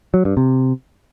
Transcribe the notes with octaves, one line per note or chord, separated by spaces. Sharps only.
F#3
G2
C3